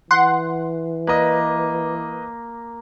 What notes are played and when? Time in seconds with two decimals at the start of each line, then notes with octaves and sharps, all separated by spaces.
0.11 E3 F#5 C6
1.07 A#3 B4 D#5